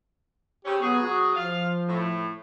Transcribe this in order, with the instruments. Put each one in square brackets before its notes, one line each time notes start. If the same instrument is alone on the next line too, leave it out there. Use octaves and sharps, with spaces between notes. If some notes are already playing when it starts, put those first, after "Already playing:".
[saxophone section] C#3 C4 C#4 [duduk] G4
[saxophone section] F#3 G#4 [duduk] B3
[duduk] F#4
[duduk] F3 [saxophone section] F4 F5
[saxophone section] A2